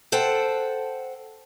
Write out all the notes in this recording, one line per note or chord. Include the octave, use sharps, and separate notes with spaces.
A4 C5 F#5 G5 A5